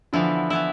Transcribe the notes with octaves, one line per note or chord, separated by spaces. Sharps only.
D3 E3 F3 B3 E4
E3 B3 E4